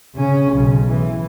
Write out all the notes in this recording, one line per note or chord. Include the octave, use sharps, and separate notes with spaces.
C#3 C#4
B1 C#3
E3